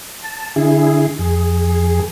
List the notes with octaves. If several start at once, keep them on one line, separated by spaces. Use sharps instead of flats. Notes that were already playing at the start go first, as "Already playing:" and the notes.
A5
D3 E4 G#4
F2 G#4